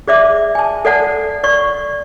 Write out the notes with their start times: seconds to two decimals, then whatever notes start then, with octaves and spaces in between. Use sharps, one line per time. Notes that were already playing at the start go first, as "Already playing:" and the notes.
0.07 G#4 D5 E5 D6
0.55 G#5 A5
0.85 A4 D5 F#5 A5
1.44 D5 C#6